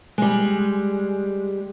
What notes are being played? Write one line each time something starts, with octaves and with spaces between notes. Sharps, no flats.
G3 G#3